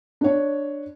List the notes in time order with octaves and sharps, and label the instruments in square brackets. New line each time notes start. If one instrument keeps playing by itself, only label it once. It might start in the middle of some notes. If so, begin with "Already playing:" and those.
[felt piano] D4 C#5